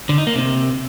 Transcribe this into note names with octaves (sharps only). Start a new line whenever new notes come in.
D3
D#4
A#3
C3